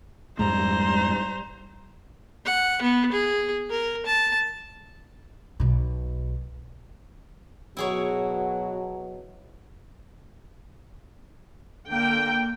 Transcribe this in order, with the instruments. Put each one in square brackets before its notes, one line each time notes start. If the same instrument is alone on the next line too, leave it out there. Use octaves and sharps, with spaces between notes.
[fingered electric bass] F2 G#2 G#3 [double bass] G3 [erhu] C5 [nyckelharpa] A#5
[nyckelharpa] F#5
B3
G#4
A#4
A5
[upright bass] B1 B2
[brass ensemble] B2 F#3 [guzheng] E4 G#4 C#5
[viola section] D3 A#3 G5